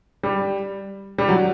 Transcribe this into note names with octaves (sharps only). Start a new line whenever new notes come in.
G3
G3
F#3